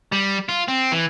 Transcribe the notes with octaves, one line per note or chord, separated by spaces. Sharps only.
G3
F4
C4
E3